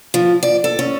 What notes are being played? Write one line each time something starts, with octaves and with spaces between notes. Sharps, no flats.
F3
D5
A4
C#4